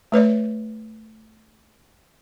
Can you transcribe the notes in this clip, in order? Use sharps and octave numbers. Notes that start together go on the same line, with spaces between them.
A3 B4 C#5 D5